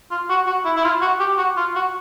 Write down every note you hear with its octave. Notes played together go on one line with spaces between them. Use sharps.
F4
F#4
F#4
E4
E4
F4
F#4
G4
F#4
F4
F#4